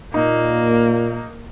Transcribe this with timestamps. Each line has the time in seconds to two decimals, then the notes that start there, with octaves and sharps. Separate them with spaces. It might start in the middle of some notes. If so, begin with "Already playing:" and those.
0.14 A#2 A#3 D#4